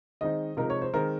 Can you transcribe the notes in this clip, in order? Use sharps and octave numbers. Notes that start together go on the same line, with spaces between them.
D#3 G#3 C4 D#4 D#5
C3 F3 G#3 D#4 A#4
C#5
C5
D#3 G#3 C4 A#4